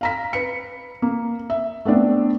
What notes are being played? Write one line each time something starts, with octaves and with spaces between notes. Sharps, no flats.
F5 A#5 B6
B4 C#7
A#3
E5
A3 B3 C4 D4